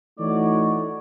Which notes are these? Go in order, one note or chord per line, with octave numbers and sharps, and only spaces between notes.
E3 A3 D#4 F#4 C#5 D5